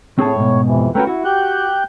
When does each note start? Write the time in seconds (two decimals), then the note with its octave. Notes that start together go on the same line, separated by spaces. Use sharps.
0.19 A2 C4 G#4 C#5 A5
0.36 G#2 B2
0.66 F2 C3 E3
0.95 A3 C#4 F#4 A#4 B4 G5
1.07 E4 F#4
1.25 G4 F#6 G6